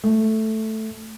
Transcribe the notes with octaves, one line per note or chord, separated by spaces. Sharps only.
A3